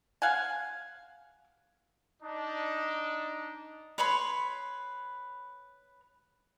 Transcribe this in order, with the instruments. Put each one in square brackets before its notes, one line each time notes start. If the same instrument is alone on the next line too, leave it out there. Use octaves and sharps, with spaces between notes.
[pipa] F5 F#5 G#5
[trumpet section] D4 D#4
[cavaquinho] B4 C#5 B5 C6